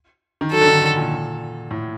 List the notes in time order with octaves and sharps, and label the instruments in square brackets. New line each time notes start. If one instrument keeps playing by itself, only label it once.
[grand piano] D#3
[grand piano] F#3 [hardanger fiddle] A4
[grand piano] D3
D#3
D3
A#2
A2